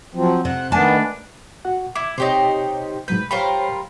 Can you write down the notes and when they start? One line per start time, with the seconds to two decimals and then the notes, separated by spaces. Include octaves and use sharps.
0.15 F3 F#3 C4
0.45 C3 C5 F#5
0.72 D#3 A3 B3 D4 G#5 A5
1.65 F#4 F#5
1.95 E4 D6 G#6
2.18 C3 D#4 G4 C5 C#5
3.08 G#2 F#3 B4 G6
3.31 G3 F4 A#4 C5 C#5 B5